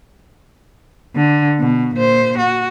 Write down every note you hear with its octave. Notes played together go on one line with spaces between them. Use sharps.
D3
B2
A#2 C5
F#4